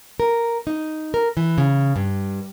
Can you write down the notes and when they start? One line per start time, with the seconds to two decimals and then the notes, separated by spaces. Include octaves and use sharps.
0.20 A#4
0.67 D#4
1.14 A#4
1.37 E3
1.58 C#3
1.96 G2